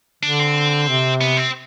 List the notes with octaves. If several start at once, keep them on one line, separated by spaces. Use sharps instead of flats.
D3 D4
C4
C3
B3
C4